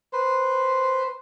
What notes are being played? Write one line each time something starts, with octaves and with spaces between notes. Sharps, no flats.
B4 C5